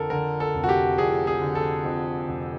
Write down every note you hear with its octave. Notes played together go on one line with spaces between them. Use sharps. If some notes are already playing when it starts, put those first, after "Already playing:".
Already playing: F2 D3 A4 A#4
D3 A#4
A4
F1
F#4
G4
F2 G#4
G#4
D3
A4
F2
F1